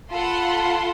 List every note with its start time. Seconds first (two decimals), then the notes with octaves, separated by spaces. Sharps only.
0.10 F4 A4 F#5 B5 C6